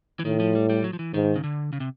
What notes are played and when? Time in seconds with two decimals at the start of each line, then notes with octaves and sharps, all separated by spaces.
0.20 E3
0.25 A2 D#3
0.40 F3
0.55 G3
0.70 G3
0.84 F#3
0.93 F3
0.99 E3
1.14 G#2 D#3
1.36 C#3
1.44 D3
1.73 C#3
1.80 C3